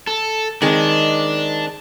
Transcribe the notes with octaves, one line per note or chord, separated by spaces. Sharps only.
A4
D#3 G#3 C4 D4